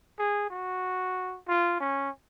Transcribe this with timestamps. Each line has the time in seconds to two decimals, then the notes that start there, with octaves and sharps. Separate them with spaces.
0.19 G#4
0.50 F#4
1.48 F4
1.81 C#4